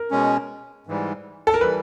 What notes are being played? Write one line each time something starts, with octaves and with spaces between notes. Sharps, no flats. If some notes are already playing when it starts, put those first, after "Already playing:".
Already playing: A#4
B2 G#3 C#4
G#2 E3 G3
A4
A#4
E3 G3 B4